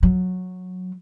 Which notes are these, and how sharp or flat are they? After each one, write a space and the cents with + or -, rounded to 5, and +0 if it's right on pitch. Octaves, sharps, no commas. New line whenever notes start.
F#3 -15